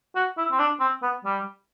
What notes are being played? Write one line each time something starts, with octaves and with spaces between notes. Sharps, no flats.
F#4
E4
C4
D4
C4
B3
G3